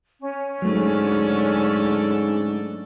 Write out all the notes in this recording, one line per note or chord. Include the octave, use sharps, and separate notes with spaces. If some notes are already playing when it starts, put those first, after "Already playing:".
C#4
G#2 D3 F#3 A3 D4 A4